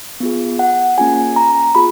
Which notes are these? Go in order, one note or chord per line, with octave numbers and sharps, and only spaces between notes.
B3 F4 G#4
F#5
A#3 C#4 F4 G#4 G#5
A#5
B3 F4 G#4 B5